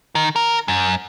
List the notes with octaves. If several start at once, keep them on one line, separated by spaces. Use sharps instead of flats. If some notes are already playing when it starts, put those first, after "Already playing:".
D#3
A#4
F#2